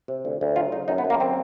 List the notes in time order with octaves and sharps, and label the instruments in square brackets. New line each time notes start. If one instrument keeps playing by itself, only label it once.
[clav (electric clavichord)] C3
D2
D2
F#3 F4
C#3 D#4
F#2 D#4
B3
F#2
A#3
D#3 C4